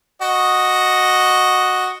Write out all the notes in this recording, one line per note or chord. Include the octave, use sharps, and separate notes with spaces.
F#4 D#5